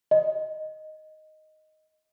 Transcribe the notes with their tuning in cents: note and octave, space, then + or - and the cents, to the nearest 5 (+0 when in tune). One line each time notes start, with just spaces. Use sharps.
D#5 +0